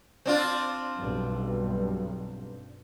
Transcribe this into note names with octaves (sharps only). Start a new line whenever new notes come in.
C4 D4 F4
B1 G2